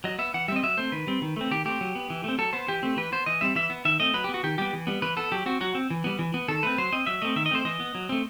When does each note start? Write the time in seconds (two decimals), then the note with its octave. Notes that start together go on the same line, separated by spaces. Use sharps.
0.04 F#3 D#5
0.19 B3 E5
0.34 E3 F#5
0.48 G3 E5
0.52 C4 D#5
0.63 F#3 E5
0.77 A3 C4 C5
0.92 D#3 B4
1.07 G3 C4
1.22 D#3
1.36 A3 C4
1.51 D#3 G4
1.65 A3 C4 G4
1.81 F#3
1.95 B3
2.10 E3
2.24 A3 C4
2.38 F#3 A4
2.53 B3 C5
2.68 E3 G4
2.83 A3 C4
2.97 E3 B4
3.12 B3 C5
3.26 E3 D#5
3.41 G3 C4 E5
3.55 E3 E5
3.70 B3
3.85 D#3 E5
4.00 A3 C4 D#5
4.14 F#3 B4
4.24 G4
4.29 B3
4.34 F#4
4.43 D#3 G4
4.58 G3 B3 G4
4.73 E3
4.87 G3 B3
5.02 E3 B4
5.17 B3 A4
5.32 F#3 G4
5.46 C4 F#4
5.61 F#3 F#4
5.75 C4
5.90 E3
6.04 G3 B3
6.19 E3
6.34 B3
6.48 D#3 A4
6.63 A3 C4 B4
6.78 F#3 C5
6.92 C4 D#5
7.07 F#3 E5
7.22 A3 C4 D#5
7.36 D#3 E5
7.46 D#5
7.51 A3 C4 C5
7.65 E3 D#5
7.80 B3
7.95 F#3
8.09 A3 C4